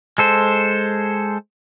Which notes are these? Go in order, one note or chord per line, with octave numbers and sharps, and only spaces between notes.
G#3 A4 C5